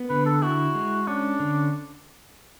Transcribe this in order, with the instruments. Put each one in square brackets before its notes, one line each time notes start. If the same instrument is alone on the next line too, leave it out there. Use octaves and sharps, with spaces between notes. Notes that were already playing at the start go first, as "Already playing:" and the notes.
Already playing: [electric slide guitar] B3
[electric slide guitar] D3 [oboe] B4
[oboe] A4
[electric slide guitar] E4 [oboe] F#4
[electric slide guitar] G#3
[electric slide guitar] C#4 [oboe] D4
[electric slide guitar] D3